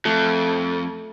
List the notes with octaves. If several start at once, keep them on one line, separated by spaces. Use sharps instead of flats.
F2 A3